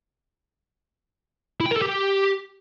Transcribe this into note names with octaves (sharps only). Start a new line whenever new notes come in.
E4
G5
A#4
A4
G4